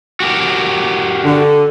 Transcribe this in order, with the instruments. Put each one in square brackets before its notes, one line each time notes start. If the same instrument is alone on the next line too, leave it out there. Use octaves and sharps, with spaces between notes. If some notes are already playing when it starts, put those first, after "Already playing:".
[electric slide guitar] F#4 G4 A#4
[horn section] D3